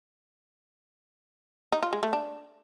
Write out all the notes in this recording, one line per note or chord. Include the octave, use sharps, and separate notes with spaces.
D#4
F4
G#3
A3
D4